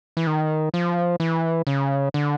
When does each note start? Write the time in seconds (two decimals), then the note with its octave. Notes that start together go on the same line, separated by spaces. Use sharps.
0.17 E3
0.27 D#3
0.74 F3
1.20 E3
1.67 C#3
2.14 D3